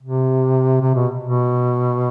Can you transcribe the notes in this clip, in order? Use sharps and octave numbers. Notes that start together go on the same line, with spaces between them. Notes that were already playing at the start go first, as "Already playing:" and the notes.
C3
C3
B2
B2